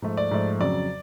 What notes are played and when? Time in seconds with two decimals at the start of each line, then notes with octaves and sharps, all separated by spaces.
0.02 G#2 F3 A3
0.17 D5
0.31 G#2 F3 A3
0.59 F2 C#3 F#3 D5